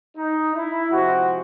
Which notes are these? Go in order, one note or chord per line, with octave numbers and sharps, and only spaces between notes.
D#4
E4
C3 F3 G#3 C4 F#4